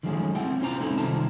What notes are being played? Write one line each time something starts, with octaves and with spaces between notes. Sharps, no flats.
D#3 F3 F#3 G#3 A3 C#4
C4 E4 F#5 G5
C#4 F4 C5 A#5
G#3 B3 C4 D#4 E4 A4
C2 D#3 F4 A5 A#5